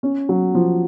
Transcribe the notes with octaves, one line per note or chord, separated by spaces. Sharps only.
C#4
F#3
F3